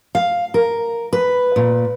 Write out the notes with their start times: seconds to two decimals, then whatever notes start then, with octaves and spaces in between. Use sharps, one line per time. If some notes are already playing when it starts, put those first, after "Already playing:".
0.15 F5
0.54 A#4
1.13 B4
1.56 A#2